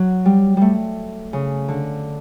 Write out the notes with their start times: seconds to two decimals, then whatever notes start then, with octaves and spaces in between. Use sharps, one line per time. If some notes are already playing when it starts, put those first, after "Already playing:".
Already playing: F#3
0.25 G3
0.57 G3 A3
1.33 C#3
1.68 D3